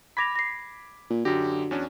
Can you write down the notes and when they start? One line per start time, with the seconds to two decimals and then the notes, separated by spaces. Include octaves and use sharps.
0.17 B5 D6 G#6 A#6 B6 F7
0.36 A#6 C7
1.10 A#2
1.25 F#2 D3 F#4 G4 A#6
1.71 E2 C#4 D4